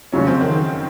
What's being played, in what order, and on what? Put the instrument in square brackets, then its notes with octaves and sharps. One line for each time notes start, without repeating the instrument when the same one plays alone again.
[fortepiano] F2 C#3 F#3 [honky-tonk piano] C#4
[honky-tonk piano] C4
D#3